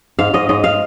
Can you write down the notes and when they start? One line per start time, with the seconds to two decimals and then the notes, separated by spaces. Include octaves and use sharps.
0.19 G#2 F5
0.34 G#2 D#5
0.49 G#2 D#5
0.64 F5